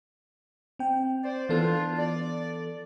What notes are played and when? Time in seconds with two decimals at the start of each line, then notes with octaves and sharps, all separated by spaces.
0.79 C4 G5
1.24 C5 D5
1.49 E3 B3 D4 F4 A4
1.97 D5